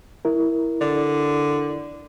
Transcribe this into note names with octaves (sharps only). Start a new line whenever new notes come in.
E4 A#4
D3